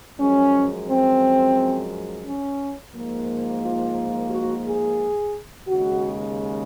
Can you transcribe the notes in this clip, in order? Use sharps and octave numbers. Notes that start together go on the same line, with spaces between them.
F#2 F3 G#3 C#4
C4
C#4
G#2 F3 A#3
F4
F#4
G#4
D#2 C#3 G#3 F#4